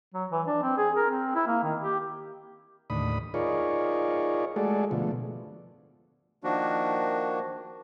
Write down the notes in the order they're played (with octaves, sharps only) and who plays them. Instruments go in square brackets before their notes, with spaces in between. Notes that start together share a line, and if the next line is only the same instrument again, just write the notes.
[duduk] F#3
E3
D4
C4
G#4
A#4
C4
E4
A#3
D#3
G4
[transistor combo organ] D#2 A2 D3 B5 D#6
D#4 F4 G#4 A#4 C#5 D5
G#3 A3 F#4 G#4 A4 D5
B2 D3 F3 A3
[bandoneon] D#3 F3 A#3 D4 F#4